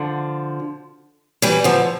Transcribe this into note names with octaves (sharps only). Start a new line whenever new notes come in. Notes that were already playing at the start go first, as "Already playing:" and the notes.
Already playing: D3 F3
E3 G3
D3 F3